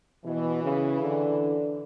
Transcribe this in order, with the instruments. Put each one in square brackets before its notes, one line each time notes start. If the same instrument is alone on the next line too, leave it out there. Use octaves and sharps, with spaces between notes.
[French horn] B2 [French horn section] E3
[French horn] C#3
D3